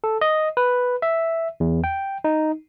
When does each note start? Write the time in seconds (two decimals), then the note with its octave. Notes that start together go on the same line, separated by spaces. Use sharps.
0.04 A4
0.21 D#5
0.57 B4
1.02 E5
1.60 E2
1.84 G5
2.24 D#4